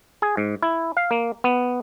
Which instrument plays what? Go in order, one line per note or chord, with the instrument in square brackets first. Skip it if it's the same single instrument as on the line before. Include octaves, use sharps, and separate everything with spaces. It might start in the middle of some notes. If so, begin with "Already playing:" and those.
[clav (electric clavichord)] G#4
G#2
E4
F5
A#3
B3